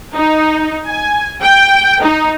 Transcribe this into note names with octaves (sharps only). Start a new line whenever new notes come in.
D#4
G#5
G5
D#4